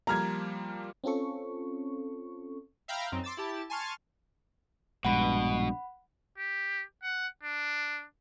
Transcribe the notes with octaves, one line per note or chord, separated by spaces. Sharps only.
F3 G3 A#3 A#5 F6 G#6
C4 C#4 F4 A4 C#6
E5 F5 G5 A#5 B5 F6
F#2 C4 D#4
C6 D6 E6 A6
E4 G4 A5
G#5 A5 C6 C#6 F6
A#1 G2 B2 G#3 F#5 B5
G4
F#5
D4